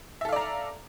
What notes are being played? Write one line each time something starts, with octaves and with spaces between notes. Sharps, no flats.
A4 D5 E5 F5 A#5